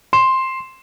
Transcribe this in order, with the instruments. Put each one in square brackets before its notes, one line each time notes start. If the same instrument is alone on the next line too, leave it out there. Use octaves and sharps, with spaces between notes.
[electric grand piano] C6 E7